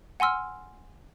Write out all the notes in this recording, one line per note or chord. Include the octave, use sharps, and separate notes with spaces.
F#5 G#5 C6 E6 F6